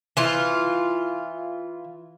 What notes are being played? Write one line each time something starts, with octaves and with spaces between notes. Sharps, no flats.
E3 F4